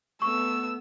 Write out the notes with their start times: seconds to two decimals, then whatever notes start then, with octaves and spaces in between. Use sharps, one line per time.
0.22 A3 B3 C#6 E6